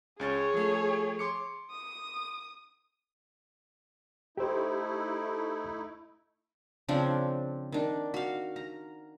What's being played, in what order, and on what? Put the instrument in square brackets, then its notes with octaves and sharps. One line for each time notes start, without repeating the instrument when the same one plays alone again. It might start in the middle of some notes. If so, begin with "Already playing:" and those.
[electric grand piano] C#2 C#4 A6 [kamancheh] G#4 C#5
[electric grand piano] F3 A3
C6 D6 C#7
[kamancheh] D#6
[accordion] A3 D#4 E4 [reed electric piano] G4 C5
[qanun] C#3 F3 C4 D4
D#3 D4
F#4 F5
A#5